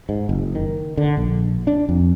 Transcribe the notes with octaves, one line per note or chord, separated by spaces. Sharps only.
G#2
F#1
D#3
D3
A#1
D4
F2